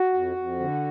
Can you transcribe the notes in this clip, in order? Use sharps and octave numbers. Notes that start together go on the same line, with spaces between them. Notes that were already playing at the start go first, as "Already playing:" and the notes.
Already playing: F#4
F2
F2
D3